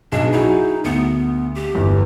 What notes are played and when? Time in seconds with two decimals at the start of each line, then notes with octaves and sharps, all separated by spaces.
0.12 B1 D4 G#4
0.32 D#4 E4 F#4 G#4
0.84 D2 B3
1.55 G4
1.75 G1 E2